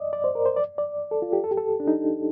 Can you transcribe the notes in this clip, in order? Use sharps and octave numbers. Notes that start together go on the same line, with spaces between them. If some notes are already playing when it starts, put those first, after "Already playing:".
Already playing: D5 D#5
D5
C5
A#4
C5
D5
D5
A4
F4
G4
A4
G4
A4
D4
D#4